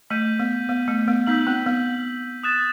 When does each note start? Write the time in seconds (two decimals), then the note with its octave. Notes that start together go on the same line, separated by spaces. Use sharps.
0.10 A3 G6 B6 D#7 F#7
0.40 B3
0.69 B3
0.88 A3
1.08 B3
1.27 B3 D#4 E6 G6 B6 F#7
1.47 C4
1.66 B3
2.43 D#6 F#6 A6 E7